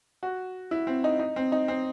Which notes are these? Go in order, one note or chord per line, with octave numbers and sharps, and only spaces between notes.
F#4
E4
C4
D#4
D#4
C4
D#4
C4